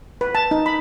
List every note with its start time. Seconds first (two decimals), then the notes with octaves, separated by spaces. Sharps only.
0.21 B4
0.35 A5
0.51 D#4
0.66 B5